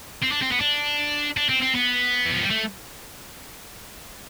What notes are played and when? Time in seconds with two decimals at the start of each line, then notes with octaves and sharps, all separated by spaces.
0.23 C4
0.32 D4
0.42 C4
0.52 B3
0.60 D4
1.37 D4
1.49 C4
1.62 C4
1.75 B3
2.26 E3
2.33 F3
2.42 G3
2.51 A3